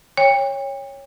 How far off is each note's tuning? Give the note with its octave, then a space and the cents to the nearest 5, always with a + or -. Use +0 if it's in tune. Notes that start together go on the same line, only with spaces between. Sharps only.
C#5 -5 G5 +35